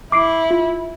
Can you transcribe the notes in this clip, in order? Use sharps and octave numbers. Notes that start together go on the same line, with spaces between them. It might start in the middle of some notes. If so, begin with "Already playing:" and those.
E4 D6 C7 D7
F4